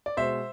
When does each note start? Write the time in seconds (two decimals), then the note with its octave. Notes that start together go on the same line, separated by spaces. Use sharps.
0.06 D5
0.17 B2 G#3 C5 E5